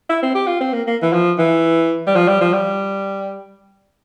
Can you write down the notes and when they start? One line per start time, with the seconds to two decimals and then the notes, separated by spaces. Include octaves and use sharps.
0.09 E4
0.22 C4
0.35 G4
0.47 F4
0.61 C4
0.73 A#3
0.87 A#3
1.02 E3
1.13 F3
1.38 E3
2.07 G3
2.15 F3
2.28 G3
2.41 F3
2.53 G3